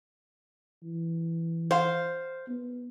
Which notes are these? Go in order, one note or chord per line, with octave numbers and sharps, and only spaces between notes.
E3
C5 F5
B3